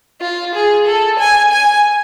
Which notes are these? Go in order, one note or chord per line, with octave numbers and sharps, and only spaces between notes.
F4
G#4
A4
G#5
G#5